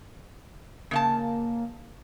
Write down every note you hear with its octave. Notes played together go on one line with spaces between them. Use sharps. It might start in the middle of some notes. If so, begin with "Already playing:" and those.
C#3 A#3 D#5 A5